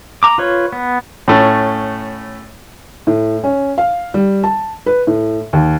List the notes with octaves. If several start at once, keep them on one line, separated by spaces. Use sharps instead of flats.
A#5 D6
F4 B4 C#5
B3
A2 A3 C#4
A2
C#4
F5
G3
A5
B4
A2
D#2